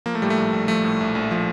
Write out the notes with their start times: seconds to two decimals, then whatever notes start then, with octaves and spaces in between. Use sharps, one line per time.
0.06 F3 A#3
0.15 A3
0.22 A2 G3
0.30 A3
0.38 A#1
0.53 A#1
0.68 F3 A3
0.84 A2
1.00 A#1
1.15 A#1
1.31 F3